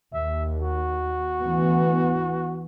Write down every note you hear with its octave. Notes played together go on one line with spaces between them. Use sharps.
D#2 E5
F#4
D2 E3 B3